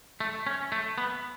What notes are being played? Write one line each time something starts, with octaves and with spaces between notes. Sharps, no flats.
A3
C#4
A3
B3